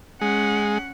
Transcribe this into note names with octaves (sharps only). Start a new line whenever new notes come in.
G#3 C#4 F#5